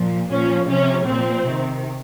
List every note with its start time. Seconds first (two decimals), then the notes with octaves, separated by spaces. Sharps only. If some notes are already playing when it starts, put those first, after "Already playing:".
Already playing: A#2 F3
0.31 A#2 F3 C#4
0.69 C3 F3 C#4
1.06 A#2 F3 C4
1.45 C3 D#3